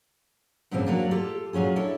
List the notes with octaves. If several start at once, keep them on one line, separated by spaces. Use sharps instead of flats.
G2 A#2 C#3 E3 C4 C#4
F#3 A#3 D4
F4 G4 A4
A#2 F#3 C#4 F4 G#4
D4 E4 A4 C#5